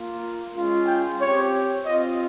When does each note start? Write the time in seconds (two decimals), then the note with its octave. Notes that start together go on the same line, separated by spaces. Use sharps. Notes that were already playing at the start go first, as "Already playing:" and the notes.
Already playing: A#3 F4
0.53 G#3 C#4 F4
0.86 G5
1.19 C4 G4 C#5
1.85 C4 F4 D#5